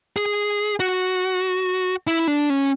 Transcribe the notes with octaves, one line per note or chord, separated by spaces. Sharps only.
G#4
F#4
E4
D4
C#4